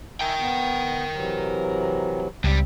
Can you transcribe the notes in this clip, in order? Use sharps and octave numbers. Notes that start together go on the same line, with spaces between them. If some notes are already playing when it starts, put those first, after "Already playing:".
A#4 E5 G5 G#5
B3
C3 E3 F#3
C#2 G2 G3 C4